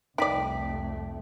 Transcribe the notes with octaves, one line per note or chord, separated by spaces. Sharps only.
C2 F2 A3 D#4 D5 G5 B6